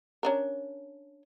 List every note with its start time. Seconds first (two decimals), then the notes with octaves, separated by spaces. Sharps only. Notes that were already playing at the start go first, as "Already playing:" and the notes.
0.23 C#4 D4 A#4